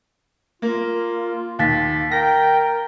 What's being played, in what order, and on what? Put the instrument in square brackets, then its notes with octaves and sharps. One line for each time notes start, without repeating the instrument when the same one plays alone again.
[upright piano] A#3 [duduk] F4
[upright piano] D#2 [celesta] F5 A6 B6
[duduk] A#4 [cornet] G5 [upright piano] A#6